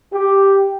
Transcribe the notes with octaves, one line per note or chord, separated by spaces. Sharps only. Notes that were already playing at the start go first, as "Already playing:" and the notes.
G4